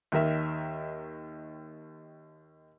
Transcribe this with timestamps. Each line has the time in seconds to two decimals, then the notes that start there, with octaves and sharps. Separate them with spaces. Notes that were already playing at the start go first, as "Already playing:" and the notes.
0.12 D#2 D#3 A#4 E5